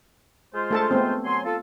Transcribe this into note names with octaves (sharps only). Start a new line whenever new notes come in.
G#3 F4 C5
A3 A4 A5
A3 B3 C4
F#3 G#5 C6
F4 A4